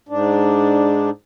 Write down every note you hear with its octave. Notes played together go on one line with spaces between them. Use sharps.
G#2 D4